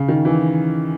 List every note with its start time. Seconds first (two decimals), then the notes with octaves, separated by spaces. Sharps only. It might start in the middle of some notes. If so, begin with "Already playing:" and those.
Already playing: C#3
0.08 D#3
0.25 E3